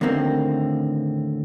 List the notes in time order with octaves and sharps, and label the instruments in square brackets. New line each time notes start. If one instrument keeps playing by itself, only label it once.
[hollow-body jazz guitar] D#2 A2 D3 A#3 C4